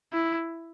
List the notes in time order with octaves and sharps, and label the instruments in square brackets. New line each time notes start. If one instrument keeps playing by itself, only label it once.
[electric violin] E4